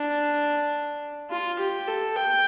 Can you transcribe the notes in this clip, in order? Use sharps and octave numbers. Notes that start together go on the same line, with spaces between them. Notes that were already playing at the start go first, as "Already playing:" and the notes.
Already playing: D4
F4
G4
A4
G5